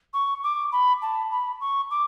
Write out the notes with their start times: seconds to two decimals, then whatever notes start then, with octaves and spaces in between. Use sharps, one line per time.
0.14 C#6
0.44 D6
0.72 B5
1.02 A5
1.31 B5
1.61 C#6
1.90 D6